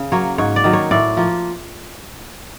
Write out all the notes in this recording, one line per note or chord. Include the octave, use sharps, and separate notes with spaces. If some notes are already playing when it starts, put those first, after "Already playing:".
Already playing: C#3
F#3 A#3 C#5
G#2 C#5
D5
D#3 F#3
C#5
A2 D5
F3 A#3